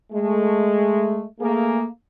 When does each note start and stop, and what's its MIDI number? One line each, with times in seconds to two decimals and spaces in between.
0.13 1.23 56
0.13 1.23 57
1.40 1.85 57
1.40 1.85 58
1.40 1.85 68